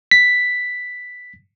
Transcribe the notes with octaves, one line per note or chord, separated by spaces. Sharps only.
B6